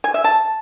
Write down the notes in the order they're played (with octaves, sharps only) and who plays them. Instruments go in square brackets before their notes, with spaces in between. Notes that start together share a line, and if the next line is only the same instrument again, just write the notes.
[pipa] G#5
E5
A5